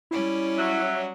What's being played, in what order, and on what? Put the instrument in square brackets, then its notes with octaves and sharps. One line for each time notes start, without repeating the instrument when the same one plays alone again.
[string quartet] G3 C#4 D5 [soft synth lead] E4
[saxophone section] F#3 [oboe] E5